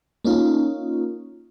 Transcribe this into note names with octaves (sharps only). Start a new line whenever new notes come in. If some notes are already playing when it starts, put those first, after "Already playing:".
A#3 C#4 D#4 F4